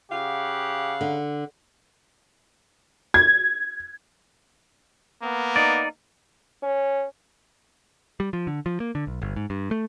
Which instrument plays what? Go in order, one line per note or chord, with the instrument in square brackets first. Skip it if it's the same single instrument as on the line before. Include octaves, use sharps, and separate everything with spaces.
[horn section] C#3 F5 F#5 [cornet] G4
[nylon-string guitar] D3
[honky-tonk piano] G#6
[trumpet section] A#3 B3
[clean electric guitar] D#4 D5
[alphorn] C#4
[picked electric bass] G3
F3
D3
F3
A#3
D3
B1
G1
G#2
G2
A3